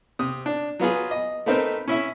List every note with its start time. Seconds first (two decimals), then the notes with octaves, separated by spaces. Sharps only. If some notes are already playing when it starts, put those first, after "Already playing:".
0.19 C3 D#6
0.46 D4
0.80 F#3 B3 F4 G#4
1.11 D#5
1.46 A3 B3 C4 D#4 A#4 C5
1.88 C#4 E4 E5